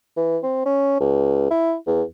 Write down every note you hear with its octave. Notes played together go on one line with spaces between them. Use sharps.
E3
C4
C#4
C#2
E4
E2